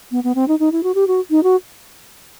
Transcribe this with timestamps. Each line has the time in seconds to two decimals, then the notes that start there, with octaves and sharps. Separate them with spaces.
0.11 B3
0.24 B3
0.35 C4
0.48 D#4
0.59 D#4
0.72 E4
0.83 F#4
0.95 G4
1.07 F#4
1.31 D#4
1.43 F#4